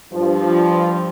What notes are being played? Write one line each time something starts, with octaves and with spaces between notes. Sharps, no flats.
G2 F3